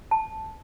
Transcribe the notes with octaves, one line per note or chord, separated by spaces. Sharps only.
A5